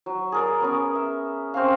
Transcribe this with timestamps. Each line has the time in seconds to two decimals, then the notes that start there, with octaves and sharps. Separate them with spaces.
0.06 F#3
0.32 G#4 A#4 D5
0.60 B3 C#4 A#4
0.95 E5
1.54 C4 C#4 F5